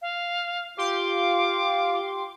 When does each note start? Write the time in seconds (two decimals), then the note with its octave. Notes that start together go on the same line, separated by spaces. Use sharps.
0.02 F5
0.78 F4 G4 C6 D6